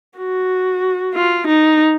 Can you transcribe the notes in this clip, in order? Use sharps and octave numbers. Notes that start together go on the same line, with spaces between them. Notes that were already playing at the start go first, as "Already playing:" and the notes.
F#4
F4
D#4